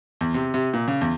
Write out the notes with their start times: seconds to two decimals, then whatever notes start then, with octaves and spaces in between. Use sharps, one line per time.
0.21 E2
0.34 C3
0.54 C3
0.74 A#2
0.88 C#3
1.01 E2